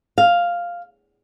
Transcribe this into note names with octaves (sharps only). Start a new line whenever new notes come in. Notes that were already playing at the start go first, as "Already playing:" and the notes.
F5